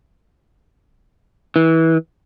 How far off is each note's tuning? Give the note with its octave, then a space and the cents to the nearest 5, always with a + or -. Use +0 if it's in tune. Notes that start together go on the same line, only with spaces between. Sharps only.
E3 -20